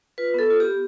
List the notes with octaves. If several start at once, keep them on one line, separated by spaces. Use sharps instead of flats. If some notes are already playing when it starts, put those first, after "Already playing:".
F4 B4
B3 A4
F4
G4
B3